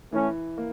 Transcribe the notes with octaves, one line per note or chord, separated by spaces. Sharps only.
E3 A3 C#4
A#3